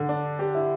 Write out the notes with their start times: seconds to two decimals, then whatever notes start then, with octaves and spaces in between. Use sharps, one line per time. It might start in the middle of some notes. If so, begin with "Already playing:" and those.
Already playing: D3
0.09 D4
0.39 G4
0.55 E4